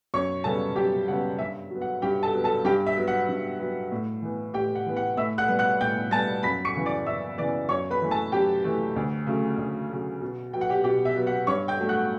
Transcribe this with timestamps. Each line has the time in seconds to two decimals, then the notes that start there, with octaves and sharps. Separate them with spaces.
0.14 F#2 C#5 C#6
0.44 C#3 G3 B3 A4 A5
0.76 F#2 G4 G5
1.08 C#3 G3 B3 F#5
1.39 G2 E5
1.70 F#3 B3
1.81 F#5
2.02 G2 G4 G5
2.23 A4 A5
2.33 F#3 B3
2.44 A4 A5
2.65 G2 G4 G5
2.86 E5
2.97 F#3 B3
3.08 F#5
3.29 G2
3.60 F#3 B3
3.92 A2
4.22 E3 B3
4.54 A2 G4 G5
4.75 F#5
4.86 E3 B3
4.96 F#5
5.17 A2 E5 E6
5.38 F#5 F#6
5.48 G3 B3
5.59 F#5 F#6
5.81 A2 G5 G6
6.11 G3 B3 A5 A6
6.43 F#2 B5 B6
6.65 C#6 C#7
6.75 C#3 E3 B3
6.86 D5 D6
7.06 F#2 E5 E6
7.38 C#3 E3 B3 D5 D6
7.69 F#2 C#5 C#6
7.91 B4 B5
8.02 E3 A3
8.11 A4 A5
8.32 F#2 G4 G5
8.64 E3 A3
8.96 D2
9.27 C#3 F#3 A3
9.58 D2
9.89 C#3 F#3 A3
10.21 B2
10.53 F#3 B3 G5
10.61 F#5
10.69 G4 G5
10.84 B2 G4 G5
11.05 E5
11.16 F#3 B3
11.27 F#5
11.47 G2 C#5 C#6
11.68 G5 G6
11.80 F#3 A3
11.89 F#5 F#6